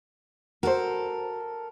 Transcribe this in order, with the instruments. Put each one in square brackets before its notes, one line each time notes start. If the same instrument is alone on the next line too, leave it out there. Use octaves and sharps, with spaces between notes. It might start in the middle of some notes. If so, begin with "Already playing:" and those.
[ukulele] F#4 C5 [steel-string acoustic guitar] A4 A#4